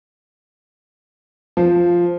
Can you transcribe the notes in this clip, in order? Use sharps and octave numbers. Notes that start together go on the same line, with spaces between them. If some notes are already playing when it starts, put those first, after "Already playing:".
F3